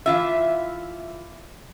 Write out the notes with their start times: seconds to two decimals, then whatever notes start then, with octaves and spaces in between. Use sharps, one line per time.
0.06 E3 F4 E5